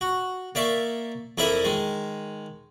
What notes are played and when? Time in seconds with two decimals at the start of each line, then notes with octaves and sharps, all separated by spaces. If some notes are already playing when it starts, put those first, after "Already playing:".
0.01 F#4
0.55 A#3 D5 E5 C#6
1.38 F2 E4 A#4 D5 E5 D#6
1.64 D#3 G#3